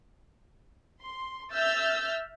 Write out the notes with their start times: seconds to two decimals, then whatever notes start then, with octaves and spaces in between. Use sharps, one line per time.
1.00 C6
1.53 E5 E6 F6 G6 A6